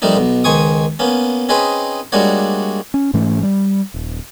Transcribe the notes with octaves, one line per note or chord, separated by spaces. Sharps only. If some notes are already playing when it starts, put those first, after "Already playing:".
F3 G3 A3 A#3 D4 D#4
B1 B2
C#2 D#3 C5 G#5 C#6 D#6
A#3 B3 C#4
C4 C#4 D#4 G#4 B4 C5
G3 G#3 A#3 D4 F#4 C#5
C#4
G#2 E3 A3 C#4
G3
D#1